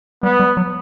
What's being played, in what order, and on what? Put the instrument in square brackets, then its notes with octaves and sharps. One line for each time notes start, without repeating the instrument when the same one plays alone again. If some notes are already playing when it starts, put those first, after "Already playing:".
[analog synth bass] G3 [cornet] B3
[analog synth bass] G3
F#3